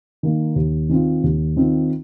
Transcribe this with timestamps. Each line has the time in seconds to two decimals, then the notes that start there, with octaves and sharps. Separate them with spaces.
0.23 D#3 A#3
0.56 D#2
0.89 D#3 C4 F4
1.23 D#2
1.56 D#3 C4 F4